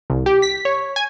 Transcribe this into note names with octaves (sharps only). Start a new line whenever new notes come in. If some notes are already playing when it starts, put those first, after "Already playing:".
C2
G4
B6
C#5
G#5